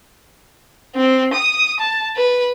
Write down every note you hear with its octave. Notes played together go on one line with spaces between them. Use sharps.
C4
D#6
A5
B4